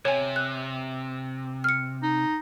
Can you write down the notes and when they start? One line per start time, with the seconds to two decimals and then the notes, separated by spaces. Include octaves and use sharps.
0.05 C3 C#5 G#5
0.36 F#6
1.64 F6 C#7
2.03 D#4